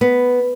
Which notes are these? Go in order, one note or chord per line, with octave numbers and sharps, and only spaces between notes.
B3